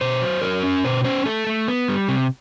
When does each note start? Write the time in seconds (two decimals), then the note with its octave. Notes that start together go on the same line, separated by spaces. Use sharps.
0.01 B2 C5
0.22 F#3
0.42 F#3 A#4
0.63 C#4
0.85 B2 C5
1.05 C#4 C5
1.25 A3 A4
1.47 A3
1.68 B3
1.88 G3
2.09 C3